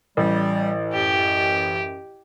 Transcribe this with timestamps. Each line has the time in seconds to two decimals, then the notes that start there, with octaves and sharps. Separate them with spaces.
0.17 A1 G3
0.93 F#2 G4